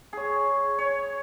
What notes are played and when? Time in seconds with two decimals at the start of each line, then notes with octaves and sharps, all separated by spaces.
0.13 G#4 C#5
0.78 C#5